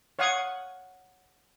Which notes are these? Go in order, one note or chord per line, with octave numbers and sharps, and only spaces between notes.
C#5 F5 F#5 C#6 D#6